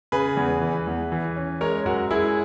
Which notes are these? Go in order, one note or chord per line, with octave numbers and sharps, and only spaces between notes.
C#3 G#4 B4
E2
E3
E2
E3
C#4
G#3 A#4 C#5
F#2 F#4 A#4
G#3 E4 G#4